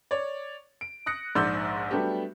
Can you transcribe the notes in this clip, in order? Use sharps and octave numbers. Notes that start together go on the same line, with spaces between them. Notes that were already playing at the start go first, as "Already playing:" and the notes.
C#5 D5
D7
D#6 F#6 A#6 C#7
A#1 G#2 D5 C6 E6 G6
F#3 G3 A3 B3 D4 G4